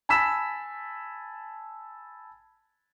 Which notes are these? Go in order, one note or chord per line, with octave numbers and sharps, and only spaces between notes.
G#5 A5 B5 E6 B6 E7